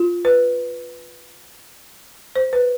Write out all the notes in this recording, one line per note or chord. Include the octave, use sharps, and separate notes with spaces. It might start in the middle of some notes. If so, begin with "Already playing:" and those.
Already playing: F4
B4
C5
B4